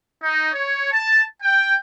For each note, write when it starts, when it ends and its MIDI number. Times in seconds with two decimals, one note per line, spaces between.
0.23 0.49 63
0.53 0.92 73
0.93 1.23 81
1.43 1.77 79